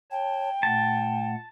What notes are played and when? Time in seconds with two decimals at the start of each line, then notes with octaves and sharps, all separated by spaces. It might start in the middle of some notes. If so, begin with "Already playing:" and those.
0.11 C#5 G5 A5
0.63 A#2 A3 F#5 A5